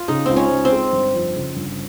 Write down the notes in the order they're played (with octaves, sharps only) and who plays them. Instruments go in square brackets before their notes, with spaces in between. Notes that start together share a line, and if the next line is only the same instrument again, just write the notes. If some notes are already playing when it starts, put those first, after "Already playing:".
Already playing: [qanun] F4
[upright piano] C#3 [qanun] D#4
[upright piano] C#2 [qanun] C4
[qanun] C#4
[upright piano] C#2
[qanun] C4
[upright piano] G#3
G1
F2
C#3
G1